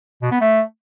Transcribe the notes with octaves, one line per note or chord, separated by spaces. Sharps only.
B2
B3
A3